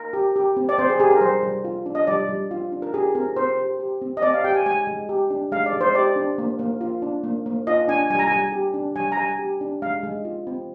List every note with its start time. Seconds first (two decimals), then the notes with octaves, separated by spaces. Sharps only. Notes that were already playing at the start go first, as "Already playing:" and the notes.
Already playing: A#4
0.13 G4
0.36 G4
0.57 C4
0.69 D5
0.78 C4 C5
0.90 G#4
1.00 G4 G#4
1.11 A#4
1.21 G3 C5
1.43 G3
1.65 F4
1.86 D4
1.95 D#5
2.07 G3 D5
2.29 G3
2.51 F4
2.72 D4
2.82 A#4
2.93 G4 G#4
3.15 C4 A#4
3.36 C4 C5
3.58 G4
3.80 G4
4.02 C4
4.17 D#5
4.22 C4 D5
4.34 F5
4.44 G4 G5
4.55 G#5
4.66 G#3 G#5
4.87 G#3
5.09 G4
5.30 D4
5.52 G#3 F5
5.66 D5
5.73 G#3
5.81 C5
5.95 G4 D5
6.16 D4
6.38 A#3
6.59 A#3
6.81 F4
7.02 D4
7.24 A#3
7.46 A#3
7.67 F4 D#5
7.88 D4 G#5
8.10 G3 G#5
8.19 A#5
8.27 G3 G#5
8.52 G4
8.74 D4
8.96 G3 G#5
9.12 A#5
9.17 G3 G#5
9.39 G4
9.61 D4
9.82 G#3 F5
10.03 G#3
10.25 F4
10.47 C4